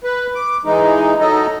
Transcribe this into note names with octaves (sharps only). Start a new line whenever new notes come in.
B4
D6
E3 G#3 D#4
F#3 D#4 A4 D#5